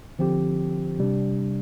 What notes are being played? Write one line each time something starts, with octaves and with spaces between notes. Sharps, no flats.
D3 F3 C4 G4
C3 G3 D4